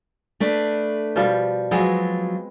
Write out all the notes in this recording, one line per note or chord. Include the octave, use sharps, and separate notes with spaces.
A3 D4 B4
B2 F3 G3
F3 F#3 G#3 B3 C4